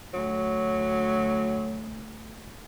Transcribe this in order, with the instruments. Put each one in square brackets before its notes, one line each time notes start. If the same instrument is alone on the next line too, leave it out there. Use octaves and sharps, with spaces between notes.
[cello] D2 [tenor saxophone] F#3